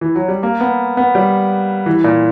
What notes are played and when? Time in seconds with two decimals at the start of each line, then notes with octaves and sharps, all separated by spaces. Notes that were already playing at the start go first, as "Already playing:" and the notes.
0.01 E3
0.15 F#3
0.28 G3
0.43 A#3
0.61 B3
0.97 B3
1.15 G3
1.86 E3
2.04 A#2